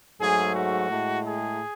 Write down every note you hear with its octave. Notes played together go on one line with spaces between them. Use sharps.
G#2 F#3 A3 G#4
F#4
A2 G#3
G#4